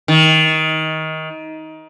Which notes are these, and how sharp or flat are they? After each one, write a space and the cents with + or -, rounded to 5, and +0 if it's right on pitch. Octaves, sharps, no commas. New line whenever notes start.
D#3 +20